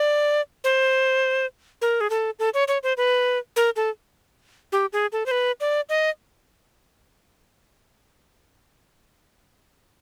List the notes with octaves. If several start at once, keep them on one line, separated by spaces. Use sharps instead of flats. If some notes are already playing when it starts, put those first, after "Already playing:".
Already playing: D5
C5
A#4
G#4
A4
A4
C#5
C#5
C5
B4
A#4
A4
G4
G#4
A4
C5
B4
D5
D#5